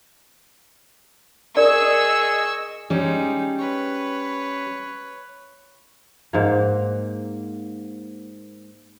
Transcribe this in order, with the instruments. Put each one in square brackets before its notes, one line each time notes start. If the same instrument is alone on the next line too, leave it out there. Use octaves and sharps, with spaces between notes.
[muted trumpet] G#4 [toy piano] A#4 D5 [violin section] D#5 C#6 E6
[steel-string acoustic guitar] G3 C#4 [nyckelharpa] G#3 D#4
[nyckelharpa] B4 C#5
[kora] G#2 A#3